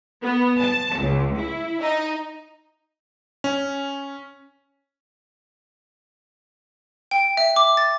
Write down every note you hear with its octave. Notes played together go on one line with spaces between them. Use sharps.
B3
A5
C#2
E4
D#4
C#4
G5
E5
D6
A6